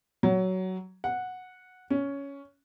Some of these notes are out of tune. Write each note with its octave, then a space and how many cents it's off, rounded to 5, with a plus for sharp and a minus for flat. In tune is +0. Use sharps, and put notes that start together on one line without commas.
F#3 +15
F#5 -10
C#4 +10